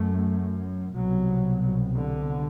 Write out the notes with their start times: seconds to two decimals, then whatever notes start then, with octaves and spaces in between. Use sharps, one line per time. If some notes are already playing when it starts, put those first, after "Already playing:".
Already playing: F#2 A3
0.96 C2 B2 F#3
1.97 D3